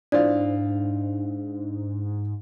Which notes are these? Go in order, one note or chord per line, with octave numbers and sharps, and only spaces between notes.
G#2 E3 C4 D4 F4 D5